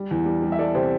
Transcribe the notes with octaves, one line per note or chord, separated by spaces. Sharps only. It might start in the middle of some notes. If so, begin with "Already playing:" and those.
Already playing: G3
E2
G3
G3
E5
G3 A4 D5
C3 G4 C5